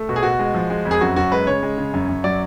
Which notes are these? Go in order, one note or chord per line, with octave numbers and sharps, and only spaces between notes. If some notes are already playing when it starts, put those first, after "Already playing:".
Already playing: A3
B2 F#4
G#4
B2 F#4
G#3
F3
G#3
F2
G#4
F#2 F#4
F#2 F#4
G#3 B4
C#3 C#5
G#3
C#3
F#2
F#2
F#3 D5